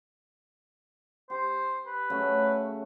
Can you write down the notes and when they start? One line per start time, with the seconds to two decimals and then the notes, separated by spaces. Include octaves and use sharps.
1.30 G4 C5
1.87 B4
2.10 C#3 F#3 A3